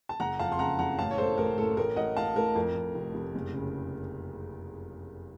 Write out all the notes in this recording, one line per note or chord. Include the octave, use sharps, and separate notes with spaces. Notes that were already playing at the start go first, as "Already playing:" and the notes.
A5
F#1 F#5 A#5
F2 F5 A5
C6
C#3 F#5 A#5
F#1 F#5 A#5
A1 F5 A5
C#5
A2 A4 C5
A1 A#4
A2 A4
A1 A#4
A1 D#5 F#5
A1 F5 A5
A2 A#4
F2 A#4
F2
F1
F1
F#1
C#3